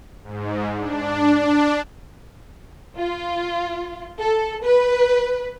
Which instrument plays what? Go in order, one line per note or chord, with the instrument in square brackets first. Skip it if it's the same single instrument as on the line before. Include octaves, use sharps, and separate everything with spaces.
[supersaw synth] G#2
D4
D4
[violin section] F4
A4
B4